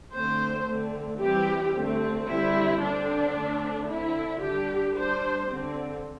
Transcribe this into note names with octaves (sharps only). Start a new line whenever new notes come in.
D3 A3 C4 C5
D3 A3 C4
E3 G3 C4 G4
D3 A3 C4
D3 G3 C4 E4
D3 C4 D4
D3 A3 C4
D3 C4 E4
D3 G3 D4 G4
G3 D4 C5
D3 C4